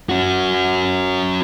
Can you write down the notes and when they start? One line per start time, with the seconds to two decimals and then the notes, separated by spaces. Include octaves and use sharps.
0.09 C#4 F#4